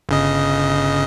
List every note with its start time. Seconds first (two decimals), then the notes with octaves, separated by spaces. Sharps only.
0.09 G1 C#3 D#5